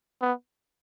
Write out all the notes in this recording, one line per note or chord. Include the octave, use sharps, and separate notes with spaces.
B3